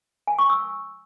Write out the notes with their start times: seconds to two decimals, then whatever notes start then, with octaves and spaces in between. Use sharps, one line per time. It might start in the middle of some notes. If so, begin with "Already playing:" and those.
0.27 G#5
0.39 C#6
0.50 E6